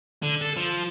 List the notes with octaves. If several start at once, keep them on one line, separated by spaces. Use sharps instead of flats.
D3
A4
F3